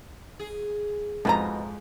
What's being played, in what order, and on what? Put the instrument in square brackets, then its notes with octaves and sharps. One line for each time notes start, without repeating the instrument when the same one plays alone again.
[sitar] G#4
[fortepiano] F2 G#2 [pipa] B2 E3 A#5